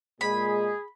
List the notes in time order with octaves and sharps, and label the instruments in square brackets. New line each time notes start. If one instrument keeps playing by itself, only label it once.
[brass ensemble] A#2 G#3 [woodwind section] G#4 [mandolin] B5